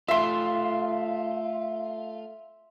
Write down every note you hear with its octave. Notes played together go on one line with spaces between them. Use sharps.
A3 F4 E5 C6